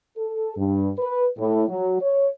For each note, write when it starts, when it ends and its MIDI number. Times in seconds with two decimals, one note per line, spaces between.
0.18 0.54 69
0.57 0.90 43
0.98 1.25 71
1.38 1.65 45
1.68 1.97 54
2.01 2.27 73